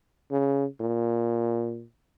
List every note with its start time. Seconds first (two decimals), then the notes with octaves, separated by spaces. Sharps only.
0.31 C#3
0.80 A#2